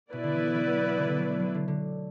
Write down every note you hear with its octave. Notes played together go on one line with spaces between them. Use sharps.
B2 B3 E4 B4 D5
D3
E3
E3
F#3
D3
D3
F#3
A3
F#3
D3
D3